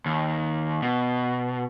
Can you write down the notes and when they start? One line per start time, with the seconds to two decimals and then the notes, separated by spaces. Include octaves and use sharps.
0.06 D#2
0.82 B2